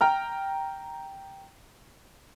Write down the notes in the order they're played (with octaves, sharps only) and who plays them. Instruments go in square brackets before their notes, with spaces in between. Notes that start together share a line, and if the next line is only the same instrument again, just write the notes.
[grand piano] G5 A#5 F6